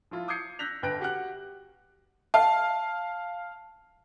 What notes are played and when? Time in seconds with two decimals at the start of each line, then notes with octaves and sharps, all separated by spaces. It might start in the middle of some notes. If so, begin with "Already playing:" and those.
0.11 F3 E4 F4
0.28 D6 D#6 G6 G#6 C7 C#7
0.59 E6 F#6 G6 A#6 B6 F7
0.82 G1 B4 G5 F#6 A#6 D7
1.00 F#4 G4 F#5 F#6
2.34 F5 A5